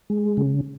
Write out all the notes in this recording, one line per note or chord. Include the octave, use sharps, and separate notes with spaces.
G#3
C#3